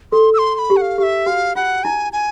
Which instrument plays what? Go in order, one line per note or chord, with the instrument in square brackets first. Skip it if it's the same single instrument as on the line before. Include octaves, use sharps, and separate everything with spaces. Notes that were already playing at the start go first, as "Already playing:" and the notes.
[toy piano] A4 [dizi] C6
[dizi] E6
C6
C6
B5
[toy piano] G4
[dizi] F#5
F5
[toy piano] G4 [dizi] F5
[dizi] E5
[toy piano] F#4 [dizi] F5
[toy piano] F4 [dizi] F#5
[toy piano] E4 [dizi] G#5
[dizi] G#5